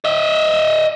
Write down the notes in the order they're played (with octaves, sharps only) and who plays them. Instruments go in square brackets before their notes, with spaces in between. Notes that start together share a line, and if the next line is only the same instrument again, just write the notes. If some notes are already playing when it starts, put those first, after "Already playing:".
[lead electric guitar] D#5 E5